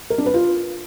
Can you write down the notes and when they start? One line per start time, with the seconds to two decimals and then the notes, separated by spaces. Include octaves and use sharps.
0.10 A#4
0.18 D4
0.26 B4
0.34 F4